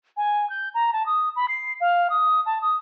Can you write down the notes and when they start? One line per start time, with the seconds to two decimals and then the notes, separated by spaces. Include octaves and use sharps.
0.17 G#5
0.50 G6
0.74 A#5
0.93 A5
1.06 D#6
1.36 B5
1.48 C7
1.80 F5
2.10 D#6
2.46 A5
2.62 D#6